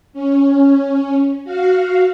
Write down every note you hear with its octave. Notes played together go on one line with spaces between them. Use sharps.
C#4
F#4 F5